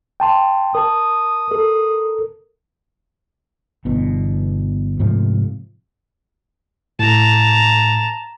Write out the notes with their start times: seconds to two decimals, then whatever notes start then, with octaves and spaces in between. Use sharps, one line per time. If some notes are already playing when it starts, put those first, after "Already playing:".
0.20 G5 A5 C6
0.75 A#4 A5 D#6
1.51 A4 A#4
3.85 G1 E2 B2
5.00 G#2 C3 F3 A3
6.99 A2 A5 A#5